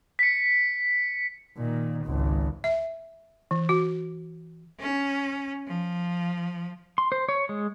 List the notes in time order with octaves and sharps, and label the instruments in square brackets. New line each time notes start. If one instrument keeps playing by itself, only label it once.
[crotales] B6 C#7
[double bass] A#2 D#3
G#1 C#2
[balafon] E5
E3
F#4
[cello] C#4
F3
[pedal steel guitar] C6
C5
C#5
G#3